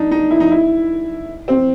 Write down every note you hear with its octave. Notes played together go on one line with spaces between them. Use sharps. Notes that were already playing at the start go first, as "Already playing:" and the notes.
Already playing: D4 D#4
D#4
E4
D#4
E4
C4